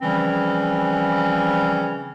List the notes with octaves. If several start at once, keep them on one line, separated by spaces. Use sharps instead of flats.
C#3 E3 F3 G3 C4 C#4